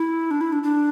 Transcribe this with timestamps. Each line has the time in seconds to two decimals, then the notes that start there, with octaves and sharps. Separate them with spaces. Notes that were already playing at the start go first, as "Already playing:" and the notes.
Already playing: E4
0.31 D4
0.41 E4
0.52 D4
0.63 D4